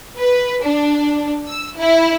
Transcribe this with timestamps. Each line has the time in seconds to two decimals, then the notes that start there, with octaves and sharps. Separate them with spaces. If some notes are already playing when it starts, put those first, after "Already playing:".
0.20 B4
0.64 D4
1.47 E6
1.78 E4